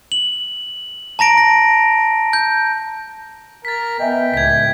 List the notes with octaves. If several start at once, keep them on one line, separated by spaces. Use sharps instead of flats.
F#7
A5 A#5 A#6 D7
A#6
G6
A#4 A6 B6
B3 D#5 E5 G5 G#5
C#2 A2 G#6 B6